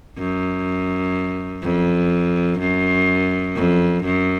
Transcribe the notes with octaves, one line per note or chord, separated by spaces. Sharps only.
F#2
F2
F#2
F2
F#2